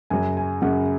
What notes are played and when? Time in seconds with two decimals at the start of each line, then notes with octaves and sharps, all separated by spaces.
0.10 F#2 C#3 F#3 G#5
0.37 G#5
0.62 F#2 C#3 F#3 F#5